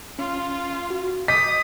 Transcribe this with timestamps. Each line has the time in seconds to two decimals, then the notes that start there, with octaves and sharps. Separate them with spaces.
0.19 C#4 F4
0.90 F#4
1.28 D#5 D6 D#6 G6 B6